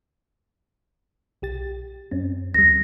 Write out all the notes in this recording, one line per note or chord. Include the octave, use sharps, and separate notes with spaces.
B1 G4 A6
F#2 C4 C#4
D2 G3 A#6